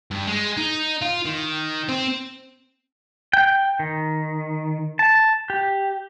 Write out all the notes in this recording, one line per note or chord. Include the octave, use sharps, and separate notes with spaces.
G2
G#3
D#4
F4
D#3
C4
G5
D#3
A5
G4